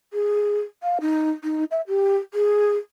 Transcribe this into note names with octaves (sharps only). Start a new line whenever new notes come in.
G#4
F5
D#4
D#4
E5
G4
G#4